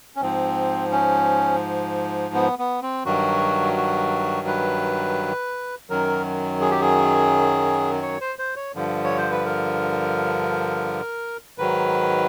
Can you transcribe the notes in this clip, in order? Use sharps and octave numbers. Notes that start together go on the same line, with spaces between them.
C#4
G#2 F3 C4
C#4
B3
B3
C4
G2 D#3 F#3 F#4
F#4
B4
F#2 D#3 F#3 A#4
G#4
G4
G#4
C#5
C5
C5
C#5
G2 D3 F3
C#5
C5
B4
A#4
G#2 D#3 F#3 B4